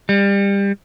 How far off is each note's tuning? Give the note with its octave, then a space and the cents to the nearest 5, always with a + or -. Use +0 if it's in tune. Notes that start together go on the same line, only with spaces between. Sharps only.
G3 +25